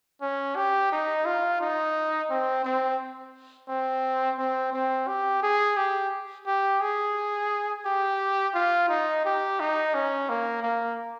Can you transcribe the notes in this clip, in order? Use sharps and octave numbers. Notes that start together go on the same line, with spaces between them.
C#4
G4
D#4
F4
D#4
C4
C4
C4
C4
C4
G4
G#4
G4
G4
G#4
G4
F4
D#4
G4
D#4
C#4
A#3
A#3